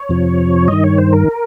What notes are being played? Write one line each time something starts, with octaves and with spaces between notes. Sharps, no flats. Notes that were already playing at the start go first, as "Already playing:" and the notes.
Already playing: C#5
F2 C3 F3
G2 D#3 D#5
C#5
C5
A#4